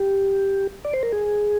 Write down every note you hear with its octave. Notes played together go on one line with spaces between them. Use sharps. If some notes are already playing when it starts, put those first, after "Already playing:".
Already playing: G4
D5
C5
A#4
G#4